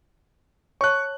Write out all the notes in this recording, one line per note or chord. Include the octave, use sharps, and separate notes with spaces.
C#5 A5 C#6 F#6